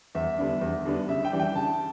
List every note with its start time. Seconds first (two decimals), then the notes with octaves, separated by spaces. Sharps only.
0.15 E2 E5
0.38 D3 G3 B3 D4
0.61 E2
0.85 D3 G3 B3 D4
1.09 C#3 E5
1.25 G5
1.32 E3 G3 D4
1.40 G5
1.55 C#3 A5